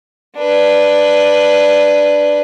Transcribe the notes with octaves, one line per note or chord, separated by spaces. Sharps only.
D4 B4